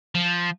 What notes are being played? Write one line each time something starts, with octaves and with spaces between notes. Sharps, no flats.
F3